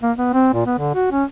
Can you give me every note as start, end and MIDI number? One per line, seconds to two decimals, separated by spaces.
0.03 0.12 58
0.17 0.30 59
0.33 0.52 60
0.53 0.63 46
0.66 0.75 59
0.78 0.92 50
0.95 1.08 66
1.11 1.24 61